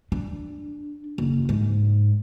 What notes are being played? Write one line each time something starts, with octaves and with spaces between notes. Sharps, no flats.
D4
F#1
G#2